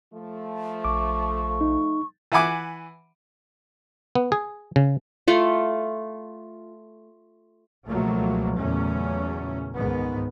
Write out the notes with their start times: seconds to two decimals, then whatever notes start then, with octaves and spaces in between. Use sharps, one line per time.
0.13 F3 A3
0.84 A#1 C#6 D6
1.61 D#4
2.32 E3 E5 F#5 G#5 D6
4.15 B3
4.32 G#4
4.76 C#3
5.28 A3 F4
7.88 C#2 B2 F3 F#3 A3 A#3
8.55 E2 A#2 C#3 F#3 A3 C#4
9.75 C#2 G#2 D#3 B3